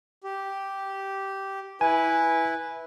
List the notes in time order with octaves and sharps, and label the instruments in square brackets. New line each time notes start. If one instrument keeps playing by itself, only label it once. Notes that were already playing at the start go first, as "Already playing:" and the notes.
[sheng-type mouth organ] G4
[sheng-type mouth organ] E4 B4 [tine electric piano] G#5